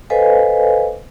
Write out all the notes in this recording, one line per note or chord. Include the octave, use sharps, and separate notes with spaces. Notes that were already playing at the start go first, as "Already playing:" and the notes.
A4 B4 C5 D#5 F5 G#5